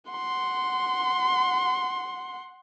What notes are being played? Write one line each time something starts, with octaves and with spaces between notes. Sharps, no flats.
F#5 C6